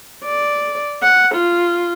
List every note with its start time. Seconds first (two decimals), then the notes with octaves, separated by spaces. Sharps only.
0.25 D5
1.03 F#5
1.35 F4